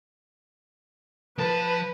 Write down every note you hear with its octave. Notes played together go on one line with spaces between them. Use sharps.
F3 B4 A5